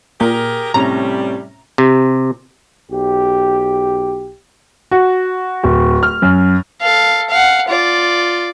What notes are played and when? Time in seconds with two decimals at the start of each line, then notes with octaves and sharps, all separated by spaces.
0.21 A#2 G4 G#4 A#4
0.74 A2 C3 G3 C#4 A#5
1.78 C3
2.92 B1 G4
4.91 F#4
5.63 D1
6.03 F6
6.22 F#2
6.82 A4 F5
7.30 F5 F#5
7.69 F4 D5